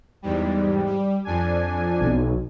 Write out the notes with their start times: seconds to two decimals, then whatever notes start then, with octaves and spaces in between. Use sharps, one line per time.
0.22 E2 G#2 G3
0.86 G3
1.25 F2 D4 G#5
2.01 B1